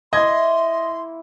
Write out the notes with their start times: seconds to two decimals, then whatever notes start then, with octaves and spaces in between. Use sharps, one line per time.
0.13 A#3 E4 D#5 C6 G#6